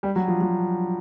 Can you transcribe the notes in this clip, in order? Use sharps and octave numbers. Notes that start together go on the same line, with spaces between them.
G3
F#3
F3
F#3